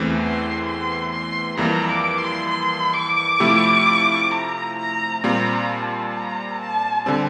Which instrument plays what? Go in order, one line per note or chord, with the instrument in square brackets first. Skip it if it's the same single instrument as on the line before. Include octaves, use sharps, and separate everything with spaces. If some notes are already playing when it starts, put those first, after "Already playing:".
Already playing: [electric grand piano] E2 E3 A3 C4
[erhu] C6
C6
C6
[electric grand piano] F2 E3 G3 A#3 [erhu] A#5
[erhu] D6
C6
C6
D6
[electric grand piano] C3 F3 A3 E4 G4
[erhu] A#5
A#5
[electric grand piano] A#2 G3 C4 F4 [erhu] A#5
[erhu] A5
A#5
A5
[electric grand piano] D3 G3 C4